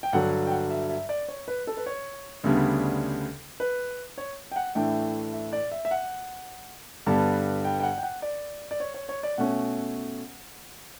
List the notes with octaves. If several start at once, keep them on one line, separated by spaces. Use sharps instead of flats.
G5
G2 D3 F#3 F#5
G5
F#5
E5
E5
D5
C#5
B4
A4
B4
C#5
D2 C#3 G3 B3 D4
B4
C#5
G5
F#5
A2 E3 A3 D4 G5
E5
D5
E5
E5
F#5
G2 D3 G3 B3 A5
G5
G5
F#5
G5
F#5
D5
D5
C#5
C#5
C#5
D5
B2 A3 C#4 F#5